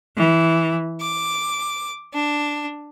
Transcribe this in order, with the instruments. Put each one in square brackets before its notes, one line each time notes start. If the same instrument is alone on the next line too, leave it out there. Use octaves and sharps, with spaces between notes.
[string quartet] E3
D6
D4